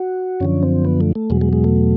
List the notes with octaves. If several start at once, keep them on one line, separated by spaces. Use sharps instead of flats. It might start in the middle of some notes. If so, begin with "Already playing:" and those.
Already playing: F#4
F#2 D3 F3 C#4
C4
B3
A3
A3
E2 B2 F#3 G#3
G#3
G#3
A3